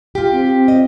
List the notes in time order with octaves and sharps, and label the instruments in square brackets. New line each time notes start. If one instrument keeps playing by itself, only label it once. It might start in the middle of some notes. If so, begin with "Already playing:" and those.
[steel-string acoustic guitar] F4 G4
[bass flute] C4
[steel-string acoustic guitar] D#5